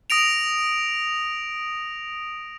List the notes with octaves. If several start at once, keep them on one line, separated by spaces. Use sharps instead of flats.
D#6 A#6 D7 F7